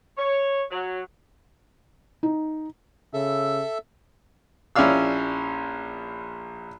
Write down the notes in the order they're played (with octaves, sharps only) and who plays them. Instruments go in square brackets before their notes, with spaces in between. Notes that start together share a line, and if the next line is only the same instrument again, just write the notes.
[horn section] C#5
F#3
[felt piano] D#4
[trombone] C#3 [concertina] A4 E5
[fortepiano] A#1 C#4 E4 D5 F5 E6